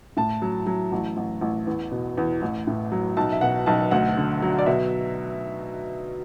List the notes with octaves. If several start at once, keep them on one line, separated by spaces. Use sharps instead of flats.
A2 A5
F#3
F#3
A1
A1
A1
E2
B2
E2
A1
A2
F#3
B1 A5
E5
B2 F#5
B1 A5
D2 F#5
D3
F#3
D5
B2 E5